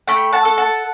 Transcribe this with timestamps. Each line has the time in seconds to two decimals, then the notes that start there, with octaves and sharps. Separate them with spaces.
0.07 A3 G5 B5
0.32 F#5 A5
0.45 A4
0.58 F#5 A5